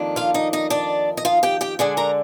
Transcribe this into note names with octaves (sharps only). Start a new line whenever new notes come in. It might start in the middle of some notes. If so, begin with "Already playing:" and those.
Already playing: F2 D#3 A#3 D4
F4 F5
D#4 D#5
D#4 D#5
D4 D5
D#5
F4 F5
G4 G5
G4 G5
D3 G#3 D4 G#4 G#5
A#4 A#5